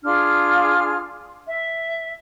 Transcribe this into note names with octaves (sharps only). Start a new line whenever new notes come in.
D4 F4 G#4 F6
E5